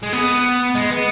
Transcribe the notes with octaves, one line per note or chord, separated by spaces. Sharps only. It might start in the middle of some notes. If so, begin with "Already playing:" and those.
G#3
B3
G#3
B3